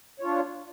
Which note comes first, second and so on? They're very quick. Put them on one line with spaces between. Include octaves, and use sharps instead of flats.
C#5 F4 D4